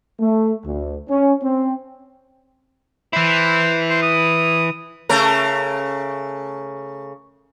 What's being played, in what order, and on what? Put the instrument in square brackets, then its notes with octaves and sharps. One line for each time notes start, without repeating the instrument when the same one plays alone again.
[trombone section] A3
D2
C#4
C4
[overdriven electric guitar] E3 E4 [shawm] C5
[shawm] C5
D#6
[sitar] C#3 A3 A#4